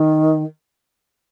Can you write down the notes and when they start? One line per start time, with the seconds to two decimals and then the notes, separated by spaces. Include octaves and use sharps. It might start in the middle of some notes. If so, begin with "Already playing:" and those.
Already playing: D#3